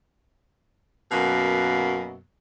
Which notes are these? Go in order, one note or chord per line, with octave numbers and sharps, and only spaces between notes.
F#2 B2 A#3